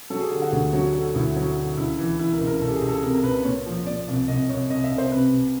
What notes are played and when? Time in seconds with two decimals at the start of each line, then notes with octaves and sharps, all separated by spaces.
0.10 F#3 A4
0.21 G#4
0.31 D3 G4
0.42 F#4
0.52 D2
0.73 F#3
0.94 D3
1.15 D2 E4
1.36 F#3
1.57 D3
1.77 C#2 E4
1.99 E3
2.19 E3 E4
2.33 A#4
2.41 C#2
2.47 A#4
2.61 C#2 A4
2.69 G4
2.76 G#4
2.82 C#2
2.89 A4
3.03 C3 A#4
3.13 A#4
3.24 C#2 B4
3.34 B4
3.44 A#2 C#5
3.66 F3
3.86 A#2 D5
4.08 C2
4.28 C2 D#5
4.49 C2 C#5
4.70 C2 D#5
4.84 E5
4.91 C2
4.98 C5
5.12 C3 B4
5.33 C3